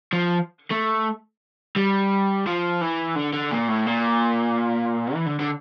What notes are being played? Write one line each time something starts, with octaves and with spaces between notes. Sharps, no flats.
F3
A3
G3
F3
E3
D3
D3
A#2
A2
A#2
E3
D3
D3